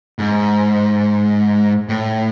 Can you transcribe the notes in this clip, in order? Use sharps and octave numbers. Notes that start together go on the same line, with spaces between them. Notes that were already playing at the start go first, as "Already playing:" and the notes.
G#2
A2